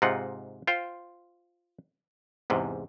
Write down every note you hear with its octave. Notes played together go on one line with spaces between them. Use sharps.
G#2 C3 D#4 F4 F#5
F4 C5 F5 G5
E2 G#2 C3